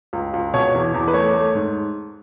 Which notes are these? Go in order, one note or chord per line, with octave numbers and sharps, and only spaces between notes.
C#2
C#2
B2 C#5
E2
E2
B4
A3 C#5
A3
G#2